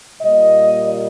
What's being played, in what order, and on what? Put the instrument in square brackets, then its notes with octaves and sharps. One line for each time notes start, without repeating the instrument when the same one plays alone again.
[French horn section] A#2 G3 A#3 D#5